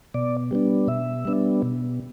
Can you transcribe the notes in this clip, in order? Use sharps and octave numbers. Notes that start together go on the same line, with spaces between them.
B2 D5
G3 B3 D4
B2 E5
G3 B3 D4
B2